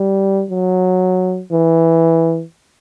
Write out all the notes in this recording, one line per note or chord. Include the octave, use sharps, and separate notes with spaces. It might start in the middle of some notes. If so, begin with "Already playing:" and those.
Already playing: G3
F#3
E3